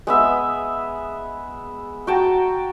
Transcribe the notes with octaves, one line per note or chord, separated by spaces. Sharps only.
G#3 B3 E5
F#4 G5 A5 A#5